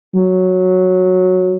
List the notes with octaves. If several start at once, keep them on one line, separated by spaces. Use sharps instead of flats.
F#3